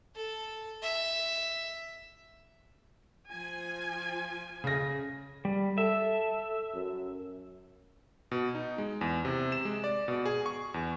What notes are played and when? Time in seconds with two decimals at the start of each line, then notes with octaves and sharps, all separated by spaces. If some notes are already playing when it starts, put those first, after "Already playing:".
0.15 A4
0.83 E5
3.30 F3 G#5
4.64 C#3 A#6
5.45 G3
5.78 A4 E5
6.75 F#2
8.31 B2
8.55 D#4
8.78 G#3
9.01 E2
9.25 C3
9.52 E7
9.65 G#3
9.84 D5
10.08 B2
10.26 G#4
10.46 C#6
10.74 E2